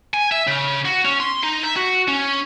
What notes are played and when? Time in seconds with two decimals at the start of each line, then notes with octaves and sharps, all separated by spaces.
0.14 G#5
0.32 E5
0.47 C#3
0.85 F#4
1.05 C#4
1.20 C6
1.43 D#4
1.63 E5
1.76 F#4
2.08 C#4